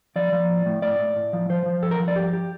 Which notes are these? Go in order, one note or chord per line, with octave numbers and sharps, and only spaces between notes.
F3 D5
F3
A2
A2
A2 D5
A2
A2
F3
F3 C5
F3
G2 A4
A#4
F3
D5
G2 G4
G4